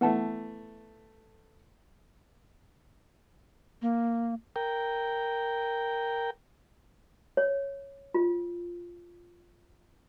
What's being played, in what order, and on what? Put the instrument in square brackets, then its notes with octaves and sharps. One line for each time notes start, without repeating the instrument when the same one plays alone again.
[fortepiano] E3 A3 [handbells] B3 F#5 A5
[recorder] A#3
[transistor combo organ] A#4 G5
[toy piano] C#5
F4